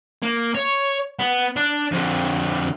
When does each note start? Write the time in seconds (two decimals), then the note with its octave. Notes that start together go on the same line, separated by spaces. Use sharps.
0.22 A#3
0.55 C#5
1.19 B3
1.56 D4
1.93 F2 D3